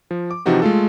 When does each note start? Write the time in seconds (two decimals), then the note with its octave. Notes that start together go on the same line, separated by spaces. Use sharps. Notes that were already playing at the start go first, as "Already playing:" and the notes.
0.11 F3
0.31 D6
0.46 C3 E3 F3 D#4 F#4 G4
0.62 G#3 A3 F4 A4